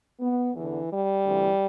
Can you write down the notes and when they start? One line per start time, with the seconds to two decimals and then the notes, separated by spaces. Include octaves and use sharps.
0.20 B3
0.54 E2 D3 E3
0.90 G3
1.25 D2 C3 E3